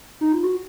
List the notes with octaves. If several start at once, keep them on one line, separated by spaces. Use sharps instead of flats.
D#4
F4
F#4